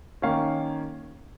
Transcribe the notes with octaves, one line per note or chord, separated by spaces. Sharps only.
D#3 A#3 C#4 F5